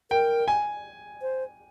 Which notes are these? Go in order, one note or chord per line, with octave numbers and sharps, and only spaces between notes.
A#4 G5
G#5
C5